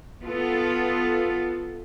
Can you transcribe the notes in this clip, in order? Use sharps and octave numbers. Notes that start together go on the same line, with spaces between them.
B3 F4 A4